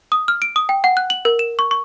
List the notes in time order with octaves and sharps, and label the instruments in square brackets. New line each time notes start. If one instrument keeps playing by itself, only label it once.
[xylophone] D#6
F6
D7
D#6
G5
F#5
F#6
F#7
A#4
E7
C#6
C#6